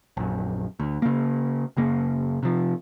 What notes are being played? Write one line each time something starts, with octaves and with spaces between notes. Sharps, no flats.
A#1 F#2
D2
C#3 A#3
F#1 C#3 A#3
C3 F3